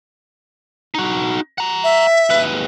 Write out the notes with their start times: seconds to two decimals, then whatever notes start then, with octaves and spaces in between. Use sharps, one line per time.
0.95 D#4 F#4
1.58 F#5 A#5
1.84 E5
2.30 D#2 B4